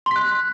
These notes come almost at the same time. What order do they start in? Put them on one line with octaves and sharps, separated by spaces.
C6 B6 F#6